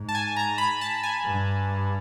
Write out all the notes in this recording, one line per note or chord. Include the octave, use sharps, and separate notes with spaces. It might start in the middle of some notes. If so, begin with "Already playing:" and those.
Already playing: G#2
A5
G#5
A#5
B5
A5
G#5
G2